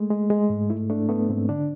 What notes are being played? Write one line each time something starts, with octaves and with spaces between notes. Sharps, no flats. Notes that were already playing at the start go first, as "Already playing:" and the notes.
Already playing: G#3 A3
G#3
G#3
G#2
A3 E4
A3 D4
A3 B3
G#2 C4
D3 D4